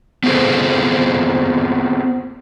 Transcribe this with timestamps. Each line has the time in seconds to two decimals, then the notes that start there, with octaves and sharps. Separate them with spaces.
0.24 B3 C4 F4 G#4 A4 C5